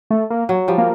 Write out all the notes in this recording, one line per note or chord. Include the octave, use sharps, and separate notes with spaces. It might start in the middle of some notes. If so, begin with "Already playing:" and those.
A3
A#3
F#3
F3 G3
A#3